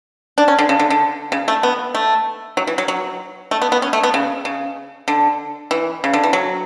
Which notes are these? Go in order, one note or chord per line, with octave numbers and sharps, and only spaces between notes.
D4
C#4
D3
C#3
D3
D3
C#3
A3
B3
A3
F#3
E3
F#3
F#3
A3
B3
B3
C#4
A3
B3
C#3
C#3
D3
E3
C#3
D3
E3
F#3